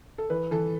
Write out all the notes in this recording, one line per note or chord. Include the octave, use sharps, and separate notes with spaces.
A4
E3 B4
E3 A4